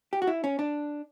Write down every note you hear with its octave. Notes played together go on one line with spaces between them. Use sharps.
G4
F#4
E4
C#4
D4